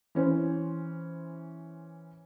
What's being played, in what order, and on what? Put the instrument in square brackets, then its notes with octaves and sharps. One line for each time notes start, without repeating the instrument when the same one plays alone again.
[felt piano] E3 C#4 C5